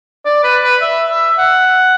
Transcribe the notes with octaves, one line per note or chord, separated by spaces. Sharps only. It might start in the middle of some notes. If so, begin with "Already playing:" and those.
D5
B4
B4
E5
E5
F#5